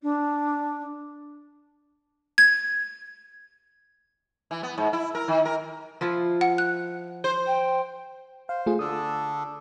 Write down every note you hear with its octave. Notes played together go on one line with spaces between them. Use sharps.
D4
G#6
E3
B3
G#2
E4
A#4
D#3
A#4
F3 E4 F4
F#5 C#7
F#6
C5
G5
C5 F5
A3 F4 G#4
D3 D4 A4 D#6 E6